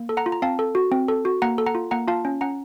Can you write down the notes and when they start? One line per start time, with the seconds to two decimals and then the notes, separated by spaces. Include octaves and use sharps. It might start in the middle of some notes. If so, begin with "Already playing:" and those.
Already playing: A#3
0.09 A4
0.17 F#5 A#5
0.26 F4
0.32 A#5
0.42 C4 F5 A5
0.59 A4
0.75 F#4
0.92 C4
1.08 A4
1.25 F#4
1.42 A#3 F#5 A#5
1.58 A4
1.66 F#5 A#5
1.75 F4
1.91 A#3 F#5 A#5
2.08 F4 F5 A5
2.25 C#4
2.41 C#4 F#5 A#5